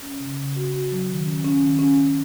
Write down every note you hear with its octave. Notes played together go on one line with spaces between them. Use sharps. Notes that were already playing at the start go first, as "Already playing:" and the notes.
C#4
C#3
C#3
F#4
F#4
F#3
D#3
C#4
C#4
D#3
C#4
C#4